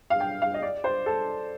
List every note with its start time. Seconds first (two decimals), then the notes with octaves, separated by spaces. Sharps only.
0.10 F5
0.20 G5
0.42 F5
0.54 D#5
0.62 D5
0.84 C5
1.06 A4